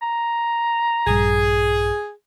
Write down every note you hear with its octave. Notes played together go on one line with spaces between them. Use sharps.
A#5
A#1 G2 G#4